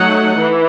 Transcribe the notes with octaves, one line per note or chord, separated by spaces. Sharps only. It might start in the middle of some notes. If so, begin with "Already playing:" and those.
Already playing: F#3 A3 D#4 F#5
E3